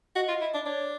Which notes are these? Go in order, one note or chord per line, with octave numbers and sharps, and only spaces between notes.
F#4 D#5
F4
E4
D4
D4 C#5